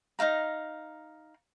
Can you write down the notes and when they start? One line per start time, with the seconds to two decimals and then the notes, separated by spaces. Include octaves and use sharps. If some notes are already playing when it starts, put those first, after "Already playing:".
0.19 D#4 E4 F5 A#5